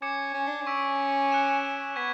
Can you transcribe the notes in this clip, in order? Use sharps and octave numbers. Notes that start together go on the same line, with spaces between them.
C#4 D6 G#6 C#7 E7
C#4
D4
C#4
C#6 E6 B6 D7
C#6 F#6 C#7 E7
B3 C#6 G#6 B6